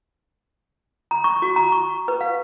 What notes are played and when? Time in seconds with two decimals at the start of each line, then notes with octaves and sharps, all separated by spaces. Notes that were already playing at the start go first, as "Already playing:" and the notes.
1.11 A#5
1.24 C#6
1.42 F#4
1.56 A#5
1.72 C#6
2.08 B4
2.21 F5